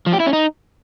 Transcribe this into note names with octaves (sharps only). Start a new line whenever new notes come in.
F3
G4
E4
C#4
D#4